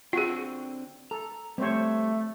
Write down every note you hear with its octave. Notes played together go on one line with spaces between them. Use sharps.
D3 C4 F4 F#4 G#4 G5
A4 A#5
G3 A3 C4 G4 C5 C#5